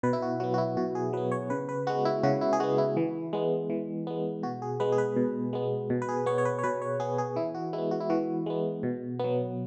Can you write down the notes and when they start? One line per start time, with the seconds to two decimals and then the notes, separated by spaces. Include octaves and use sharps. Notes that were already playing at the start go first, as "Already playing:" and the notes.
0.03 B2 B4
0.13 E4
0.22 F#4
0.40 F#3 B3 F#4
0.54 F#4
0.58 E4
0.77 B2 F#4
0.95 G#4
1.13 F#3 B3 B4
1.32 C#5
1.50 C#3 B4
1.69 B4
1.87 G#3 B3 F#4
2.05 E4
2.23 C#3 F#4
2.41 E4
2.53 G#4
2.60 G#3 B3 F#4
2.78 E4
2.97 E3
3.33 G#3 B3
3.70 E3
4.07 G#3 B3
4.43 B2 F#4
4.62 G#4
4.80 G#3 B3 B4
4.92 G#4
4.98 B4
5.16 B2
5.53 G#3 B3
5.90 B2
6.02 B4
6.09 G#4
6.26 B3 C#5
6.38 C#5
6.45 B4
6.59 C#5
6.63 B2 B4
6.82 C#5
7.00 B3 G#4
7.18 G#4
7.36 E3 E4
7.55 F#4
7.73 G#3 E4
7.78 B3
7.91 F#4
8.00 E4
8.10 E3 F#4
8.46 G#3 B3
8.83 B2
9.19 F#3 B3